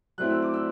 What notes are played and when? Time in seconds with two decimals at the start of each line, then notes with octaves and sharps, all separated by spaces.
0.18 F#3 A3 C4 E4 F#6
0.30 E6
0.43 D6
0.54 E6